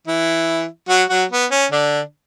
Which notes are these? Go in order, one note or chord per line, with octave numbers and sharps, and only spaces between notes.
E3 E4
F#3 F#4
F#3 F#4
B3
C#4
D3 D4